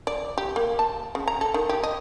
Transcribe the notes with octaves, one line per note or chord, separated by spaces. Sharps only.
D5
G4
A#3
A5
C#3
A#5
A4
D#3
G4
D#5